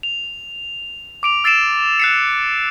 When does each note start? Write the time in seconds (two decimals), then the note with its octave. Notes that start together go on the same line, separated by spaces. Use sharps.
0.03 F7
1.23 D6 D7 F7
1.44 E6 A6 C7 D7 E7
2.00 F#6 C7 C#7